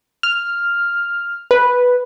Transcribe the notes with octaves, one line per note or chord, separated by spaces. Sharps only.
F6
B4